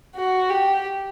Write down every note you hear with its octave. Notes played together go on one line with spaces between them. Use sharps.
F#4
G4